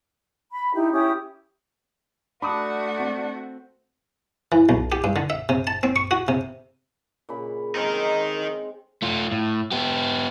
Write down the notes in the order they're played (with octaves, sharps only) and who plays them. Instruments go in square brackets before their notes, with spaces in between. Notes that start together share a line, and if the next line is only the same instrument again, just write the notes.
[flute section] B5
D#4 E4 G4
C#4 E4 G4 D#6
[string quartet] A3 F#4 [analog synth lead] D4 [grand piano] B5 D6 D#6
[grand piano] C4
[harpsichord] E3
B1
G4
G2
D3
E5
C3
A5
C4
C#6
F#4
C3
[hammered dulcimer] A#2 C#3 B5
[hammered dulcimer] G#3 C4 [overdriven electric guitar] D#4 A#4
[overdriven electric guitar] A3 F4
A2
B3 G4